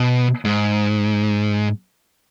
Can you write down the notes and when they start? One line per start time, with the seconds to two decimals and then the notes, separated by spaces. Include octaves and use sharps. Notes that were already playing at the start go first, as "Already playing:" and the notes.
Already playing: B2
0.45 G#2